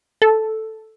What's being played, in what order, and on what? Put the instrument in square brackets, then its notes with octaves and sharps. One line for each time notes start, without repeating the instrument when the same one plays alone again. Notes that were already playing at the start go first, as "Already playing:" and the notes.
[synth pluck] A4